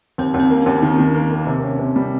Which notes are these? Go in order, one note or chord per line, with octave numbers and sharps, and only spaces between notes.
D#2 C4
D#2
C4
A#3
D#2 C#4
D#3
D#3
A#3
A#3
C3
C#4
C3
G3